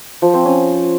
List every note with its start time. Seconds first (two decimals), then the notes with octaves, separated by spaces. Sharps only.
0.22 F3
0.34 C4
0.46 C#4